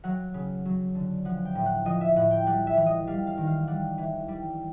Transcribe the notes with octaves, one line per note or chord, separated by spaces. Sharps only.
F#3 F#5
C#3
F#3
D3
F3 F#5
G5
A2
F#5
F3 D#5
E5
A2 F#5
G5
G3 F#5
E5
E3
D#5
G3 F5
F5
D#3
F5
G3 F#5
E3
G3